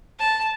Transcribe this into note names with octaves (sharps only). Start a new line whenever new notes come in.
A5